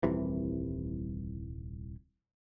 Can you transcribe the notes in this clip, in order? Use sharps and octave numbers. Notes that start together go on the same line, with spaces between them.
D#1 C2 C3 E3